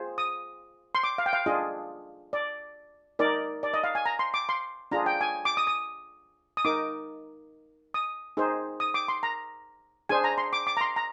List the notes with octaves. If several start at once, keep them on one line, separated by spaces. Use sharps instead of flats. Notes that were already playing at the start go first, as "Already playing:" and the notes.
Already playing: F4 G#4 C5
D#6
C6
D6
F5
G5
F5
D4 F4 G#4 D#5
D5
D#4 A#4 D5
D5
D#5
F5
G#5
A#5
C6
D6
C6
D4 F4 G#4 A#5
G5
G#5
D6
D#6
D#6
D#6
D#4 A#4 D6
D#6
D#4 G#4 C5
D#6
D6
C6
A#5
D4 G#4 C5 G#5
A#5
C6
D6
D6
A#5
C6
A#5